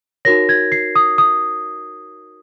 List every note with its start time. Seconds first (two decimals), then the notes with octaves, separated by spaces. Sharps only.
0.25 D#4 F#4 A#4 C#5 A#6
0.49 G#6
0.72 C7
0.96 D#6
1.18 D#6